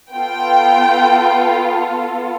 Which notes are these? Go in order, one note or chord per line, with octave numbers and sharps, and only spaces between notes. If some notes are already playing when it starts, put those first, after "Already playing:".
B3 F4 A4 G5